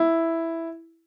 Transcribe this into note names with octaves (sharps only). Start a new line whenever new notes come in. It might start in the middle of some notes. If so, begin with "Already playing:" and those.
Already playing: E4